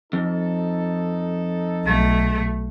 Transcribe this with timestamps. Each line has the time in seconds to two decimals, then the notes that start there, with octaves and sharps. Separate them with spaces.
0.13 F2 D#4 A4
1.86 B1 A3